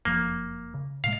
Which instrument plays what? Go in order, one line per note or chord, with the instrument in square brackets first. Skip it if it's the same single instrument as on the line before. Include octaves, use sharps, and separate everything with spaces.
[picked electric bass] F#1 F2 F3 [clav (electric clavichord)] A#3
[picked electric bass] C#3
[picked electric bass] A2 C3 G#3 [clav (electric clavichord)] F5